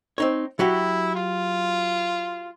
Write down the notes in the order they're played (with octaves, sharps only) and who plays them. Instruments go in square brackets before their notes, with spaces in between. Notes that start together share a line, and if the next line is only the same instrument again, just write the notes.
[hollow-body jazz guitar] C4 D#4 C#5
[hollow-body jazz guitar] F#3 F#4 G4 [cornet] E4
[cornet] F4